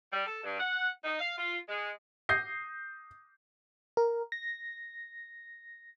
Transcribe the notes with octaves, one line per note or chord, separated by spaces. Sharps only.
G3
A4
G2
F#5
D#4
F5
F4
G#3
D#6 G6 A#6 C7
A#4
A#6